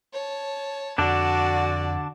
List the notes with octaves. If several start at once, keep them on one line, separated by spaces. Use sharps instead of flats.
C#5 A5
F2 D3 D4 F#4 D5 A5